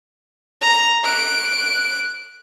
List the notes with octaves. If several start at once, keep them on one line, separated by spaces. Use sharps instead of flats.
A#5
F#6 D7